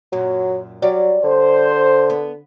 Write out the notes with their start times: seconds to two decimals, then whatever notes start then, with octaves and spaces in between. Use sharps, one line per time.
0.13 F#2 A#2 F#3
0.82 F#3 G3 C#5 D5
1.24 D3 C5
2.10 B3